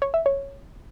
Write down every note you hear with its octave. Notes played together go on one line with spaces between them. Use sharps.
C#5
E5
C#5